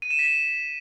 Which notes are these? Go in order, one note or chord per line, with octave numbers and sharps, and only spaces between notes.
D#7
E7
B6